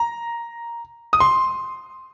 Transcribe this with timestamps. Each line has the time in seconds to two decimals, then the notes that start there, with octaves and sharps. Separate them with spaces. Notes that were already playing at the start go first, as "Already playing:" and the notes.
Already playing: A#5
1.13 D#6
1.20 C6